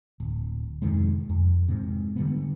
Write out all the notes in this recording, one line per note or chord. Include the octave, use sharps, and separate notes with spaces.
D1
F2 C3 D#3 G#3
F2
G#2 C3
D3 G3 B3